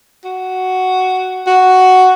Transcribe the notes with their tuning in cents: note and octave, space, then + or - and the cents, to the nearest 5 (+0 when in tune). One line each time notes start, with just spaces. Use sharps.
F#4 +5
F#4 +5